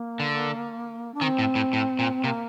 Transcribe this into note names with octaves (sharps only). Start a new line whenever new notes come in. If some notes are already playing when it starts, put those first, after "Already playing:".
Already playing: A#3
D3
D4
D#3 C4
A2
A2
A2
A#2
C3 A#3